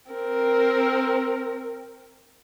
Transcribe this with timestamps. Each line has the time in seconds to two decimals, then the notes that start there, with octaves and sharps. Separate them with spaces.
0.12 C4 A#4